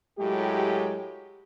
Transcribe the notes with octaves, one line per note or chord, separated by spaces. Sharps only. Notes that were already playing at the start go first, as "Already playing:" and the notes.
A2 F#3 G#3 G4